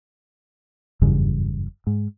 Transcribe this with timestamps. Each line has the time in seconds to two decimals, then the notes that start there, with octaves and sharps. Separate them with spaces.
1.01 F#1 E2 G2 C#3
1.87 G#2